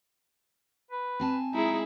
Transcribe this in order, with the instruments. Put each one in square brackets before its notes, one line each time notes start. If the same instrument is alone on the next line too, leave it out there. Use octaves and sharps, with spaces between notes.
[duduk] B4
[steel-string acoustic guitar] C4 G#5 A5
[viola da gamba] G#3 E4 G#4 [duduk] D#4